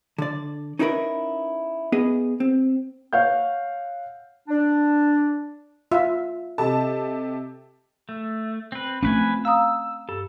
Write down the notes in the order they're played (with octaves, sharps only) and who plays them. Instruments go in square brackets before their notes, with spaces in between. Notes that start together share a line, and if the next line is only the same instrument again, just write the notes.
[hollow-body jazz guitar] D3 D5
C#4 D#4 E4 F#4 A#4 B4
B3 G#4 D#5
C4
[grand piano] C#5 F5 F#5 G6
[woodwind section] D4
[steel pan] F4 E5
[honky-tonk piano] C3 A5 [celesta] A4 D#5
[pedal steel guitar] A3
C4 B4
[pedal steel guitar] F3 B4 G#5 [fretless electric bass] A3 C4 C#4
[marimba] F5 A#5 D#6 [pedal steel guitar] E6
[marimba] G2 [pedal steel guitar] A4